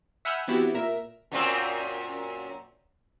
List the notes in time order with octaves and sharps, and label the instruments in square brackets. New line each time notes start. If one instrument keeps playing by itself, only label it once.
[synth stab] E5 F#5 G#5 B5 F6 G6
E3 B3 C4 E4 F#4 G4
A#2 A#4 E5
[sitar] F#2 A#2 C4